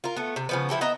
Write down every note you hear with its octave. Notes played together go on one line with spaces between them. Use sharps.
F4 A#4
A3 B3
C3
C#3 F3 B3
F3 E4 G4 A4
B3 D#5 E5 A#5